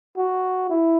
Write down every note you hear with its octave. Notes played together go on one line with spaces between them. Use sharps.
F#4
E4